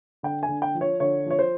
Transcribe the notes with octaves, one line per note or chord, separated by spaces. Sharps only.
D3 G5
G#5
D3
G5
F3
C#5
D3 C#5
F3 C#5
C5